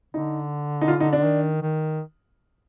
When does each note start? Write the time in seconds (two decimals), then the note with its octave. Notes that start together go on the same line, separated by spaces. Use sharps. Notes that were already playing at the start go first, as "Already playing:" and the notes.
0.14 D3 D#4
0.81 D#4
0.88 F4
1.00 D#4
1.13 D4
1.25 D#3
1.62 D#3